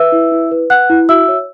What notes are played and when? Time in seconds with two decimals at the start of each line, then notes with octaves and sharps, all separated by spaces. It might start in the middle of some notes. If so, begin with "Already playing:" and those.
Already playing: B4 E5 E6
0.12 E4
0.32 E4
0.51 B4
0.70 B4 F#5 F#6
0.90 E4
1.09 F#4 E5 E6
1.28 C#5